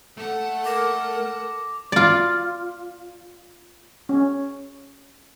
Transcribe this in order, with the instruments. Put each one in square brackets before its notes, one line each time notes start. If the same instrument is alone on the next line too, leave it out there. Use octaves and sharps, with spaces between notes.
[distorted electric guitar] A3 [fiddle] A4 F#5
[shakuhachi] A#4 [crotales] D6 A#6 E7
[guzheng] F4 D5
[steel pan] C#4